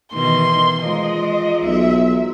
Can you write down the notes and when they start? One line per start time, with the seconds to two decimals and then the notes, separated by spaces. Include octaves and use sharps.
0.13 B2 D#3 E3 C6
0.83 F3 G#3 A#3 D#5
1.64 B1 E5